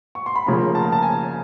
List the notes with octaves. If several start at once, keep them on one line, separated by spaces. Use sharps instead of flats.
C#6
C6
B5
D2 C#3 F3 A#3 A#5
A5
A#5
A5
G#5